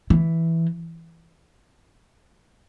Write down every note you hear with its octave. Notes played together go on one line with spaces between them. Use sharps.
E3